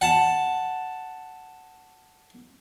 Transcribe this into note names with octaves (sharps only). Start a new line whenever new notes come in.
F#5 A5